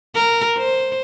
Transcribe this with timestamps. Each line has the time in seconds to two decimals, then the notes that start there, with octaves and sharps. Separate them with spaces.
0.15 A#4
0.58 C5